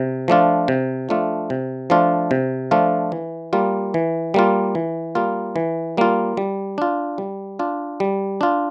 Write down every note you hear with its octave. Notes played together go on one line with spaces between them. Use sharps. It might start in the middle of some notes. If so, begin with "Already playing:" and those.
Already playing: C3
F3 A3 D4 F4
C3
F3 A3 D4 F4
C3
F3 A3 D4 F4
C3
F3 A3 D4 F4
E3
G3 A#3 F4
E3
G3 A#3 F4
E3
G3 A#3 F4
E3
G3 A#3 F4
G3
D4 F4
G3
D4 F4
G3
D4 F4